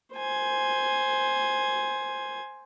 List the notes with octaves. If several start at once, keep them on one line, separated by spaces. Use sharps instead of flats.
C5 G#5